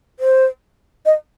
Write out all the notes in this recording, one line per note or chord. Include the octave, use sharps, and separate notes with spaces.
C5
D#5